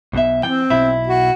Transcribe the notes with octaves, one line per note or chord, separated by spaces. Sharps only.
B1 B2 E5
E3 C4 G5
B1 E4 E5
F#4